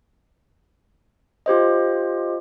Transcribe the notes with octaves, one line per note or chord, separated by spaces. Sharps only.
F4 G4 C5 D#5